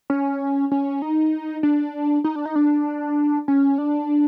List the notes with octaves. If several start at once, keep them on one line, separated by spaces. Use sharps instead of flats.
C#4
C#4
D#4
D4
D#4
D4
D#4
D4
C#4
D4